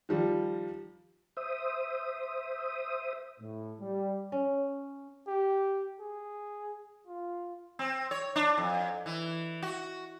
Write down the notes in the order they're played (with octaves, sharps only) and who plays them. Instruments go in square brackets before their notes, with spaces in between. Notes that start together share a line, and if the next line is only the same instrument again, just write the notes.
[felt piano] D#3 F3 G3
[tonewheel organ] C5 E5 D#6
[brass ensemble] A2
G3
[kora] C#4
[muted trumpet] G4
G#4
F4
[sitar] C4
C#5
D4
F2
E3
F#4